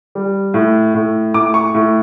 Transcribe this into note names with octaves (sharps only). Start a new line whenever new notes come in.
G3
A2
A2
A2 D6
C#6
A2